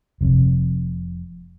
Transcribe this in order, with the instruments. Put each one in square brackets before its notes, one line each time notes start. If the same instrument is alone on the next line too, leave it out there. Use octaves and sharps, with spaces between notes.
[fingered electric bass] F1 F2 C3